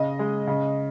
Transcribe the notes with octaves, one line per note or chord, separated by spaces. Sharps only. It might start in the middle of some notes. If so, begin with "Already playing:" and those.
Already playing: C#3 D#5
G#3
C#3